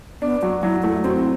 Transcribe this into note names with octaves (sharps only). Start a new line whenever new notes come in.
B3 D4
F#3 F#4
F#3 E4
A3 E4
C4 F#4
E4